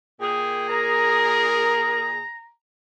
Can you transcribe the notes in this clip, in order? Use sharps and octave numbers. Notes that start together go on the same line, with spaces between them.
A#2 G#4 G5
A#4 A#5